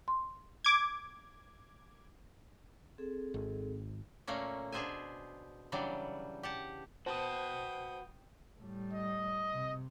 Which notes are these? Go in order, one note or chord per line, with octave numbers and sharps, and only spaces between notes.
C6
D6 G#6
C4 G#4 A4
G#1
A#2 A3 A#3 C#4
B2 D4 G#4 C5 E5 G#5
C#3 E3 F#3 G3 D4
G4 F#5 A5
F#4 B4 C5 G5 A5 D#6
A2 G3
D#5
C3